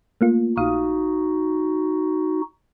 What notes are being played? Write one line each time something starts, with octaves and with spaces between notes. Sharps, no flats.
A3 A#3 F4
A#1 D#4 F#4 F5 D#6